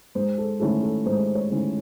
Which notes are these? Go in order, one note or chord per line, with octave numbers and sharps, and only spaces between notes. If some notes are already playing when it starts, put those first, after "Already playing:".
G#2 C5
A4
D#3 A3 C#4 E4 A4
A4
G#2 C5
C#5
D#3 A3 C#4 E4